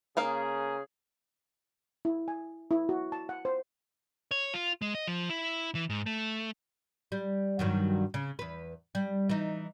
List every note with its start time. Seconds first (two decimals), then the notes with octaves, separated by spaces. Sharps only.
0.17 C#3 A#3 G#4 A#4 F5
2.05 E4
2.28 G#5
2.71 E4
2.89 F#4
3.12 A5
3.29 F#5
3.45 C5
4.31 C#5
4.54 F4
4.82 G#3
4.95 D#5
5.08 F3
5.30 E4
5.75 E3
5.90 G#2
6.06 A3
7.12 G3
7.59 G2 D#3 F#3
8.14 C#3
8.39 E2 B4
8.95 G3
9.29 E3 D#4